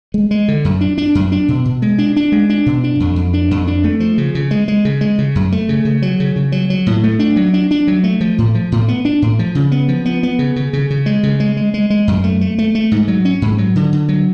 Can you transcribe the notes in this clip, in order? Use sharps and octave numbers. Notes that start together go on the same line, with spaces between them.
G#3
G#3
D3
F#2
D4
D4
F#2
D4
B2
B2
G#3
D4
D4
G#3
D4
B2
D4
F2
F2
D4
F2
D4
A3
F3
C#3
C#3
G#3
G#3
C#3
G#3
C#3
F#2
A3
C#3
C#3
F#3
C#3
C#3
F#3
F#3
A2
A3
D4
F#3
D4
D4
F#3
A3
F3
A2
F3
A2
B3
D4
A2
F3
C#3
B3
F3
B3
B3
C#3
C#3
C#3
C#3
G#3
C#3
G#3
G#3
G#3
G#3
F#2
A3
A3
A3
A3
G#2
F#3
C#4
G#2
F#3
D3
D3
F#3